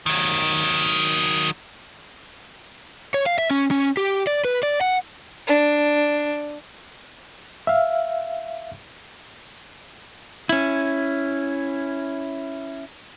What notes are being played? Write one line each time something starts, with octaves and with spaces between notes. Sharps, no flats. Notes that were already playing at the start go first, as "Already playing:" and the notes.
D#3 F#3
C#5
F5
E5
C#4
C#4
G4
D5
B4
D5
F#5
D4
E5 F5
C#4 E4